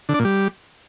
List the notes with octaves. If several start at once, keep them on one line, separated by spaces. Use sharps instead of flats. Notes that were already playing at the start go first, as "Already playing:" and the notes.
D3
D4
A#2
G3